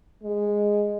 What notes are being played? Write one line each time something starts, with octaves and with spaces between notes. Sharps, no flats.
G#3